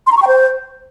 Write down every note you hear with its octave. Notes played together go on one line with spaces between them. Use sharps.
C6
A#5
C#6
G5
C5